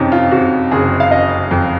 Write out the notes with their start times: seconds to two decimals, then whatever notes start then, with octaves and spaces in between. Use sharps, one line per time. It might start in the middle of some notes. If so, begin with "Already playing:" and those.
Already playing: F2 C3 C#4 D#4
0.12 F4
0.31 C3 F#4
0.71 F#1 G#4
1.00 F5
1.11 F#1 D#5
1.51 F2